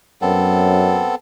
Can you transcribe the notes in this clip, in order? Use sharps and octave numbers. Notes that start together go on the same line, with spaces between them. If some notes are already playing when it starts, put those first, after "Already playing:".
F#2 B3 C4 A4